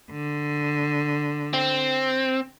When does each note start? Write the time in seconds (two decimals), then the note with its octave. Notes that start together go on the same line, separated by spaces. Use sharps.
0.11 D3
1.53 C4